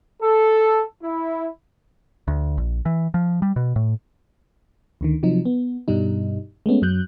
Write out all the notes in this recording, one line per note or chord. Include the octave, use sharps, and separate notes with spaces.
A4
E4
D2
A#1
E3
F3
G3
B2
A2
D2 D3 D#3
C3 F3 F#3 D#4
B3
G2 B2 G3 D#4
G#3 A3 B3 C#4
F#2 F#3 F#6 G6